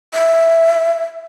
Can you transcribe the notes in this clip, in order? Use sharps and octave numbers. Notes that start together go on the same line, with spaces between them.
E5